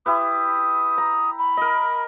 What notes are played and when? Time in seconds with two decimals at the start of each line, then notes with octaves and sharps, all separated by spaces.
0.06 E4 G4 B4 D#6
0.98 A#5
1.39 B5
1.57 A#4 D#5